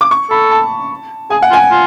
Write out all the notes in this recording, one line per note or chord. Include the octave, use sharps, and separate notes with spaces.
D6
C#6
A4 B5
A5
G#4 G#5
F#5
F4
G#5
F4